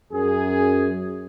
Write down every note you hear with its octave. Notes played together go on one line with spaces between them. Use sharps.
F#2 G#4